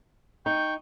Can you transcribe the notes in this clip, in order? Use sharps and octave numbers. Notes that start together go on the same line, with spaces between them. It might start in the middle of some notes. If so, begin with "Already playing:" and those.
D#4 G5 C#6 G6